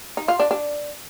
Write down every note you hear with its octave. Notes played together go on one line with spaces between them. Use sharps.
D#4
F4
D4
D4